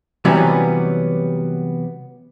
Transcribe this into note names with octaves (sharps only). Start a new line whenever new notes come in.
C3 E3 F#3 G3 B3 C#4